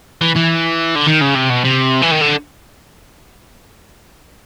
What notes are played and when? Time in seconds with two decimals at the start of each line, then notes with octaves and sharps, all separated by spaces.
0.21 E3
0.36 E3
0.96 D3
1.07 D#3
1.21 C#3
1.35 C3
1.50 B2
1.65 C3
2.02 E3
2.12 D#3
2.21 D3